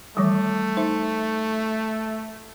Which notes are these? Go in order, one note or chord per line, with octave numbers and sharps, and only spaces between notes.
D#3 E3 G3 A3
D#4 C5 E5